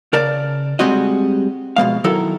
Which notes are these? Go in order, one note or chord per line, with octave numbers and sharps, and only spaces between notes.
C#3 A#4 D5 A5
G3 G#3 C4 F#4 D#5
F2 B2 G#3 F5
D#3 F#3 E4 A4 A#4